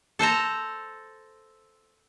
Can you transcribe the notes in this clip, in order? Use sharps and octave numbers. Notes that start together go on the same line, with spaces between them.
A4 C5 A5 A#5